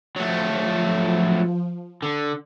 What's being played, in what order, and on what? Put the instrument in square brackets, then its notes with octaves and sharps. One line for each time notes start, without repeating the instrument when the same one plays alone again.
[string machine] F3 [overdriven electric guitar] F#3 A3
[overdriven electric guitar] D3